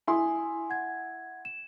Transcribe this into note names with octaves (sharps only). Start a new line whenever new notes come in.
E4 G#5 C6 D#6
F#5 G#6
E7